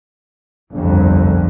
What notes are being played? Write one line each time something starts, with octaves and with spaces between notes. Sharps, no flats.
G1 C2 F2